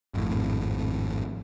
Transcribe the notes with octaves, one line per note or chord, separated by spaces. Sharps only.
G#1 F2 A2